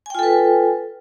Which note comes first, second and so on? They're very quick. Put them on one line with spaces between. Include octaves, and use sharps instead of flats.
G#5 G5 F4 A4 B4